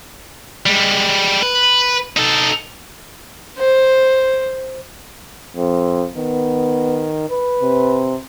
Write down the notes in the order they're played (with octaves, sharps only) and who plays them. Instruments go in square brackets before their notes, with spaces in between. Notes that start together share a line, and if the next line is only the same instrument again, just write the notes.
[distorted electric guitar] G3 G#3
B4
D#4 A4
[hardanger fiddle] C5
[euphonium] F2
[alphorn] D#3 [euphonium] B3
[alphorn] B4
[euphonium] C3